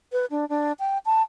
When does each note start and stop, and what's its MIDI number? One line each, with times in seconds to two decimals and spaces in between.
0.12 0.25 71
0.31 0.48 62
0.49 0.73 62
0.80 0.98 79
1.06 1.22 81